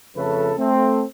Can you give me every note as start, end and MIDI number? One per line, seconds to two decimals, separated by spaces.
0.16 0.52 41
0.16 0.52 49
0.16 0.52 53
0.16 0.52 57
0.16 0.52 69
0.16 0.52 71
0.58 1.03 57
0.58 1.03 60